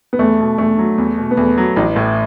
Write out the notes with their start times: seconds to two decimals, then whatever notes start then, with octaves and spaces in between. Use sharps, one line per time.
0.13 B3
0.19 E2 A3
0.40 B2
0.58 E2 A3
0.79 F#3
0.98 E2
1.18 B2
1.31 B3
1.37 E2 A3
1.58 F#3
1.76 A1 E3
1.96 A2